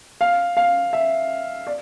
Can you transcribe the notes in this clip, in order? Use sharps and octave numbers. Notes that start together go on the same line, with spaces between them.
F5
F5
E5
D5